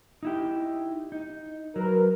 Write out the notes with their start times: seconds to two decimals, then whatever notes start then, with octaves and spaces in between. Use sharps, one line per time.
0.23 D#4 E4 G4
1.12 D#4
1.76 F#3 A#4 B4